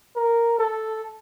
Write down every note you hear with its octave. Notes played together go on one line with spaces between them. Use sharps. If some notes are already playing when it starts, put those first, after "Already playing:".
A#4
A4